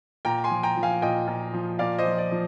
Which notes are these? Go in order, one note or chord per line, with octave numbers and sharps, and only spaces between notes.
A#2 G5 A#5
G#5 C6
F3
G5 A#5
F3
F5 G#5
A#2 D#5 G5
A#2
F3
A#2 D5 F5
C5 D#5
F3
D5
F3